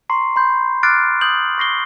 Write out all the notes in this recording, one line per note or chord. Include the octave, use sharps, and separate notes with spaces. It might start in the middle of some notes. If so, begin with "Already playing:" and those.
A#5 C6 C#6 C7
B5 C6 G6
D6 F6 F#6 A6 C7 D7
D#6 G6 F#7
C#6 A#6 C7 G7